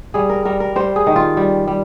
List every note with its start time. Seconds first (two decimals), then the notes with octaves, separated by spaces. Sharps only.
0.14 G3 G#4
0.29 A#4
0.45 G3 A#4
0.60 A#4
0.76 G3 C5
0.96 G#4
1.07 D#3
1.16 F4
1.37 G3
1.68 G3